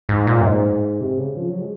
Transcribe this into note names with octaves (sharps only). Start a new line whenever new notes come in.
G#2
A#2
F#2
G#2
C3
C#3
F3
F#3
G#3